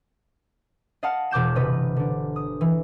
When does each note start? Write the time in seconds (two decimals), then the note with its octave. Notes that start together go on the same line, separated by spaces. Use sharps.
1.03 D#5 F5 F#5 A5 F6
1.31 E1 B2 D6 G6 E7
1.56 G1 C3 B4 D#5
1.96 D3 D4
2.36 D#6
2.61 E3